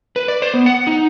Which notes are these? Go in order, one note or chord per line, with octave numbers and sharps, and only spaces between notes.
B4
D5
C5
B3
F#5
D#4